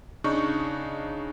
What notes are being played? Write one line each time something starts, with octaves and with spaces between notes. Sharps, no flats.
C#3 D4 D#4 C#6